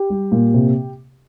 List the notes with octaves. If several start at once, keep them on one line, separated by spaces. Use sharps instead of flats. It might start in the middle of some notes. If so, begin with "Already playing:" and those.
Already playing: G4
G3
A#2
C3